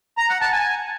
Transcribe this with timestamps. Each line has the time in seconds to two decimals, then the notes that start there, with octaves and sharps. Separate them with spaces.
0.18 A#5
0.29 F#5
0.41 A5
0.53 G#5